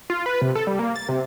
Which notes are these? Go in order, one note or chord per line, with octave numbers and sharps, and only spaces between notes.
F4
B4
C3
A4
G3
A#3
A6
C3